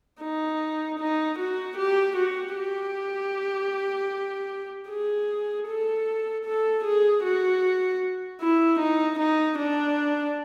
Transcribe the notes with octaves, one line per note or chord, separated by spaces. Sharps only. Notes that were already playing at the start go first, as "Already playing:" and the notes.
D#4
D#4
F#4
G4
F#4
G4
G#4
A4
A4
G#4
F#4
E4
D#4
D#4
D4